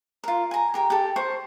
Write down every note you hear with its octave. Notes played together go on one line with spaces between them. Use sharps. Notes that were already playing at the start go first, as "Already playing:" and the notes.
F4 A#4
G#5 A#5
G4 A#4 G5
G4 A4
C5 C#6